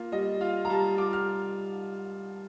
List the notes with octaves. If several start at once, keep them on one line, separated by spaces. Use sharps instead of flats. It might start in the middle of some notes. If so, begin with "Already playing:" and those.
Already playing: A#3 F4
G3 D#5
F4 F5
A#5
G3 A5
F4 D6
F6